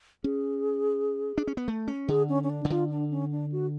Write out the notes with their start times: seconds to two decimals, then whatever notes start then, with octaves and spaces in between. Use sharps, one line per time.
0.24 C#4 G#4
1.38 D4
1.47 C#4
1.57 B3
1.68 A3
1.88 C#4
2.08 D3 G#4
2.29 C#4
2.43 C#4
2.50 D4
2.65 C#3
2.70 D3 F4
2.90 D4
3.11 C#4
3.31 D4
3.52 F#4